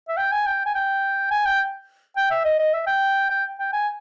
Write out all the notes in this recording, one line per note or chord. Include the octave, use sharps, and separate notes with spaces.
E5
G5
G#5
G5
G#5
G5
G#5
G5
G5
E5
D#5
D#5
E5
G5
G5
G5
G#5